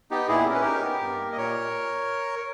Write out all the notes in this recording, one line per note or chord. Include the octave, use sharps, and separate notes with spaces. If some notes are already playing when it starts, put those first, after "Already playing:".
B3 D#4 G4
A#2 E4 G#4
C#4 A#4
B4
D#4 G4 A#4
B3
G2
A#3
D#5
A#2 A#4 C#5